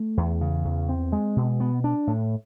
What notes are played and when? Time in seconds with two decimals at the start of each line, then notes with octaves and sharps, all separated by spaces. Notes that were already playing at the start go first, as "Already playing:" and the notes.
Already playing: A3
0.17 E2
0.41 C#3
0.65 E2
0.89 C4
1.12 G#3
1.36 B2
1.60 B3
1.84 D4
2.07 A2